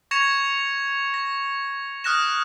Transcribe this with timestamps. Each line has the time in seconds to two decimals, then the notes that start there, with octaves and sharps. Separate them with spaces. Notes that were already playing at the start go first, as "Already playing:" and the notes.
0.11 C#6 G#6 A#6 C#7 E7 F7
1.14 A#6
2.04 D#6 F6 F#6 A#6 E7